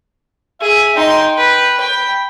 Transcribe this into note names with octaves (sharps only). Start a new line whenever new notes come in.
G#4 E5
D#4 G5 C6
B4
G5 B5